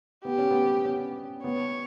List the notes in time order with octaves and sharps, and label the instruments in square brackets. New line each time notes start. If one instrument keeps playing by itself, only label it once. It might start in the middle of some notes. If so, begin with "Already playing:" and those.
[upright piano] B3 [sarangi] G4
[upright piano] C#4
B3
C#4
[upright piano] B3 [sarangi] C#5